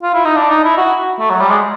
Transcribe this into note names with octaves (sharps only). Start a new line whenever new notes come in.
F4
E4
D#4
D4
D#4
E4
F#4
A3
F#3
G3
G#3